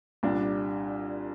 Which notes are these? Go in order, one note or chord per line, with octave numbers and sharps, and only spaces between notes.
C2 A#2 G3 D4